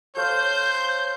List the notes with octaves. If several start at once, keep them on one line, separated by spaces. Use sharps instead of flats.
A4 C5 C#5 F5 G6